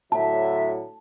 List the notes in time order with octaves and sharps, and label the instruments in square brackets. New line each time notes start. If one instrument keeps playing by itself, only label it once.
[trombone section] A2 D3 F#3 [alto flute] E5 [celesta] A5